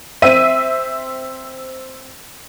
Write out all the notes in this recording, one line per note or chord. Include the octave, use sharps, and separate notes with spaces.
C4 E5 D#7